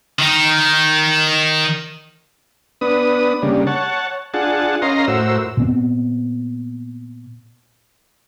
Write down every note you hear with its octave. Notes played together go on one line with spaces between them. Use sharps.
D#3 D#4
B3 D4 B4 D#6
C#3 G3 A#3 D4
C#5 F#5 A5
D4 F4 G#4 F#5 A5
C#4 A#4 D#5 F5 A#5 C6
A2 F#4 A#4 C5 E6
A#2 B3 C4